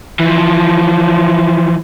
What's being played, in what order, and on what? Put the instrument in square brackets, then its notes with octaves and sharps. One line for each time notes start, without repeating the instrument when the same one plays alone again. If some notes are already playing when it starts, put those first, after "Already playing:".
[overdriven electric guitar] E3 F3